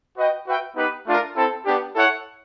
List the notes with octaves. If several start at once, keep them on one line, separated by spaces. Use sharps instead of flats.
F#4 B4 D#5 G5
F#4 B4 E5 G5
B3 D#4 G4 B4
A3 D4 F4 A#4
C4 E4 A4
B3 D4 G4
E4 A4 C#5 F#5